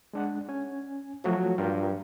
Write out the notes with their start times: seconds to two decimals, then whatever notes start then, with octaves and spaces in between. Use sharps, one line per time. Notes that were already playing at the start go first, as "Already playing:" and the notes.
0.13 G#3 D4 F#5
0.49 C#4 G#5
1.24 F3 F#3 A3 F#4
1.58 G2 F4 A#4 G5